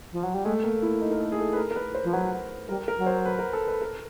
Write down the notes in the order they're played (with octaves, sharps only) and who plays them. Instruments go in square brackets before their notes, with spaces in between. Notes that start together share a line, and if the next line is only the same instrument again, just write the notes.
[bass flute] F3
F#3
G3
[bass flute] G#3 [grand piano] A3
[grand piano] A#3
E4
D#4
A#4
A4
G#4
A4
B4
A#4
A#4
B4
C5
[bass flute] F3
[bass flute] F#3 [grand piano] B4
[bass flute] G3 [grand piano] A#4
[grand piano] A#4
[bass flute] F#3
[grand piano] C5
B4
A#4
A4
B4
A#4